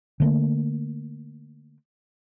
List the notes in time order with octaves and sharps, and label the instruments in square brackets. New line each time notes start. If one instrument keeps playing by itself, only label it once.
[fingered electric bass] D3 A3 A#3